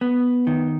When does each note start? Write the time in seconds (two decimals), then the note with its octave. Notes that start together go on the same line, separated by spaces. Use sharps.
0.01 B3
0.47 D#3